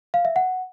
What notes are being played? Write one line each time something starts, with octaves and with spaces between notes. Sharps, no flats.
F5
E5
F#5